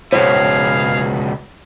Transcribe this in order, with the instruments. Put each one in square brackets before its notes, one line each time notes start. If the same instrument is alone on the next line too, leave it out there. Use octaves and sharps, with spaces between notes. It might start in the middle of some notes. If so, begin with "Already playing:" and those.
[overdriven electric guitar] C#2 B2 [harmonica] G#4 F5 [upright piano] C5 C#5